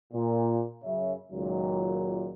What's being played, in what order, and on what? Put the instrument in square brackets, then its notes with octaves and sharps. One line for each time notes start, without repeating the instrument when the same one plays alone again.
[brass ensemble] A#2
F#2 C#3 C#5 E5
C#2 A#2 D#3 F#3